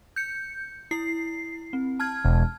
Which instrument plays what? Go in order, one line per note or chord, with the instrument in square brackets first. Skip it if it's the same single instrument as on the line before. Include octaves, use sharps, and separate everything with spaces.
[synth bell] G6 C#7
E4 C7
C4
A5 F6 G#6
[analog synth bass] E1